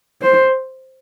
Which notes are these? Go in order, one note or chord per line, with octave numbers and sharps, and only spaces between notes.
C5